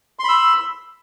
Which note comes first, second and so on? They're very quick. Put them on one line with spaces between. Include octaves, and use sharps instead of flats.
C6 B5 E6